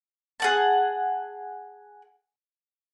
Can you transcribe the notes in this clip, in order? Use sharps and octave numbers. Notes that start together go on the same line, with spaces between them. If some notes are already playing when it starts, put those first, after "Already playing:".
G#4 F#5 A5